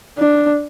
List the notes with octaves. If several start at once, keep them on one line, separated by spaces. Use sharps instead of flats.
D4